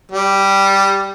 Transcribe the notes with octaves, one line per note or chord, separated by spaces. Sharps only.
G3